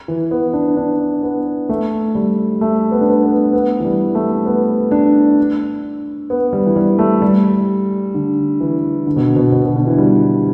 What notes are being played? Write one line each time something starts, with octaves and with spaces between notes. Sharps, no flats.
E3
B3
D4
D4
B3
A3
G3
A3
B3
D4
B3
B3
B3
E3
G3
A3
B3
D4
B3
G3
E3
G3
A3
G3
D3
E3
D3
B2
B2
B2
B2
D3
E3
G3